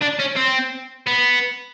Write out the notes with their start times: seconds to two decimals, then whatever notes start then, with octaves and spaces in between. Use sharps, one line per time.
0.02 D4
0.20 C#4
0.36 C4
1.07 B3